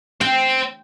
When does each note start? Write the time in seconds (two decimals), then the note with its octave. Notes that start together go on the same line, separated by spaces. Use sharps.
0.21 C4 G5